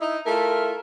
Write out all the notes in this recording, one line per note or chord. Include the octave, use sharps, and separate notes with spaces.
D#4 E4
A3 E4 F4 A#4